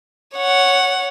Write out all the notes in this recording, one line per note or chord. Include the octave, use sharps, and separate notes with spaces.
C#5 F#5